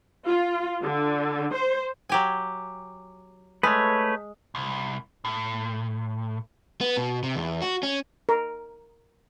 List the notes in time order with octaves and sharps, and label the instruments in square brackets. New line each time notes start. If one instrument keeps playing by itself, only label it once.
[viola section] F4
D3
C5
[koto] F#3 G4 G#5
[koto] G#3 [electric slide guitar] A3 [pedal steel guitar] B4 C#5
[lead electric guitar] C2
A2
[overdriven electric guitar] B3
B2
C3
E2
F#4
C#4
[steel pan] A#4